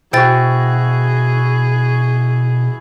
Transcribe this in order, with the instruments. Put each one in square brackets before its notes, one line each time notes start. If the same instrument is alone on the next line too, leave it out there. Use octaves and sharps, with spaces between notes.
[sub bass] B2 [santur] E4 F#4 [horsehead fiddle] G#4 [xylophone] C5 G5 A6